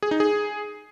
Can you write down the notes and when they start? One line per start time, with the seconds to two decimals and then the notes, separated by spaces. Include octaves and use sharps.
0.03 G#4
0.11 D#4
0.20 G#4